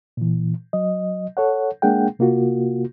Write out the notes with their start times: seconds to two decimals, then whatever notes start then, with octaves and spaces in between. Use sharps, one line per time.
0.17 A#2 E3
0.73 F#3 D#5
1.37 A4 C#5 F#5
1.82 G#3 A#3 D4 G#4 F#5 G5
2.19 C3 A#3 F4 F#4